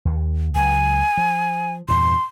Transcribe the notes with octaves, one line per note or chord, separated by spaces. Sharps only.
D#2
C#2 F#3 G#5
F3
E2 G2 A#2 C6